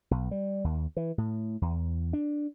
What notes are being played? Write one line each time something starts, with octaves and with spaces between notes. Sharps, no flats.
B1
G3
D#2
E3
A2
E2
D4